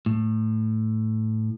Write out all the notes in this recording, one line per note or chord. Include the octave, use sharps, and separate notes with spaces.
A2